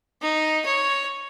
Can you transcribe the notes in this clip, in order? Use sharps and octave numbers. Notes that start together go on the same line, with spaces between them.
D#4
C#5